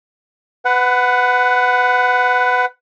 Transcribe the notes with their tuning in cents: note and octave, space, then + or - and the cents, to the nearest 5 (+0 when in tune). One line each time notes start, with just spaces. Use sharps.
B4 +20 F#5 +0